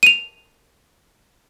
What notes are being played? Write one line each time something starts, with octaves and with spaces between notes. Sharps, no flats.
D#7 F7